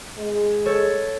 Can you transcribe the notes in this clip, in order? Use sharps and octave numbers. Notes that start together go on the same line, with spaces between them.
G#3
A4 C#5